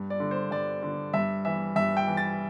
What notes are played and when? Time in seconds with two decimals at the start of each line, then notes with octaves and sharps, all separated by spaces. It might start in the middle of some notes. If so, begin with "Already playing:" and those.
Already playing: G2
0.10 D5
0.20 D3
0.31 C5
0.51 G2 D5
0.83 D3
1.13 G2 E5
1.45 E3 E5
1.76 G2 E5
1.97 G5
2.07 E3
2.17 A6